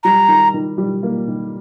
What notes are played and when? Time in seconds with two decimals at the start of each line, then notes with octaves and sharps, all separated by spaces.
0.03 G3 A#5
0.28 D#3
0.54 D#3
0.78 G3
1.03 A#3
1.28 D#3